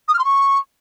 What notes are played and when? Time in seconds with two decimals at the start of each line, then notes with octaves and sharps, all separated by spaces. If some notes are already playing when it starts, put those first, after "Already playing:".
0.08 D#6
0.13 F6
0.19 C6
0.24 C#6